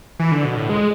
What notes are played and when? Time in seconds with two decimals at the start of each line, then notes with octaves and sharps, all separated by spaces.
0.20 E3
0.32 D3
0.45 B2
0.57 A2
0.69 G#3